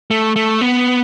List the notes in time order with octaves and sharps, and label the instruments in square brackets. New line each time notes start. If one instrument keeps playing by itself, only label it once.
[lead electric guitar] A3
A3
B3